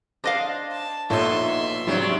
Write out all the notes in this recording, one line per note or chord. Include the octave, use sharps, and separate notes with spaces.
D4 C5 D#5 F5
A5
A#1 B2 B3 D#4 A4 C#5 E5 C6
G#2 C3 F#3 G3 D4